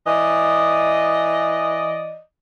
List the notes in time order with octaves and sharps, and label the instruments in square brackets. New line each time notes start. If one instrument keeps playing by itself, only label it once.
[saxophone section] E3 D5 D#5